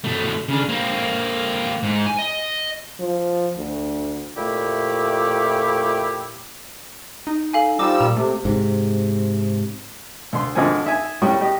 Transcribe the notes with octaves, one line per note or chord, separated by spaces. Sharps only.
B2 A3
C#3 D4
A#3 C4
G#2
G#5
D#5
F3
D2
F2 A#2 A3 E4 G4
D#4
A4 F5 G#5
F3 G3 D#4 D6 E6
A#2 A#5
C3 A3
G#2 C3
D2 C6
G#1 D3 F3 G#5
D#4 E5 G#5
A2 G3 G5 C#6
G4 D#5